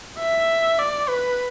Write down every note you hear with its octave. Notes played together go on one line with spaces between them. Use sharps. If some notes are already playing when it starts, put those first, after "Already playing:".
E5
D5
B4